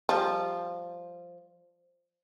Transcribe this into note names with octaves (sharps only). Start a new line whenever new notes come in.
F3 G3